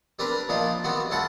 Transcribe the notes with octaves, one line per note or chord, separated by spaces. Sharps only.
G3 C4 D4 A#4 B4
A#2 F3 D4 D#4 F4
D#3 G3 B3 C4 F#4
C2 E4 F4 F#5 A5